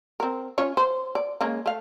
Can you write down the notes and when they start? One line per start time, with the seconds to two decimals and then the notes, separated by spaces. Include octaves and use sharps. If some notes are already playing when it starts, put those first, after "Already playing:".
0.20 C4 A#4
0.58 C#4 F4 C#5
0.77 C5
1.15 D5
1.41 C#3 G#3 A#3
1.66 A3 F5